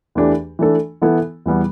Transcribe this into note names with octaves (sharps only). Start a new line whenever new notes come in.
E2 E3 A3 D4 G4
E3 A3 D4 A4
E3 B3 E4 A4
E2 E3 G3 B3